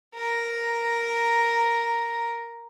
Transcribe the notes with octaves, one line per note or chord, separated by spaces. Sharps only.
A#4 A#5